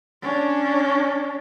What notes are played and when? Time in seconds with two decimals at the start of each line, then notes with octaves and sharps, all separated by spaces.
0.22 C#4 D4